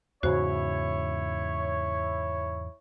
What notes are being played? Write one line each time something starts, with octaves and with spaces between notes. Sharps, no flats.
E2 G#2 C#3 E4 F#4 C5 C#5